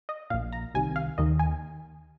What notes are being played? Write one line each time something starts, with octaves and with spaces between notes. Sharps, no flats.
D#5
A#1 A#2 F5
A#5
C2 C3 D#3 G#5
F5
D#2 D#3 D#5
G#5